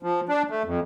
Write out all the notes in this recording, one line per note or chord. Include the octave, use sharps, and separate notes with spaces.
F3
D4
A3
F2